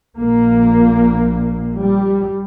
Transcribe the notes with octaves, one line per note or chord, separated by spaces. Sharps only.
A#1 A#2 A#3
G3